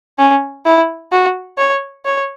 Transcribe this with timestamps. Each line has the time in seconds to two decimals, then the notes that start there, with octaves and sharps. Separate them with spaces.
0.18 C#4
0.65 E4
1.12 F#4
1.58 C#5
2.05 C#5